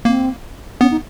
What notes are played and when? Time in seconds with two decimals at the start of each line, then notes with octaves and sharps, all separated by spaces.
0.05 A#3 C4
0.81 B3 C#4
0.91 D#4